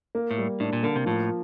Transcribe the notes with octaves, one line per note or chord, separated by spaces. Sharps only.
A#3
A2
G3
A2 D4
A#2
D3 A#3
C3
A2 F3